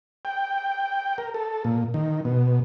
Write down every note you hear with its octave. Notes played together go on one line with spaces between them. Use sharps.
G5
A#4
A4
A#2
D#3
B2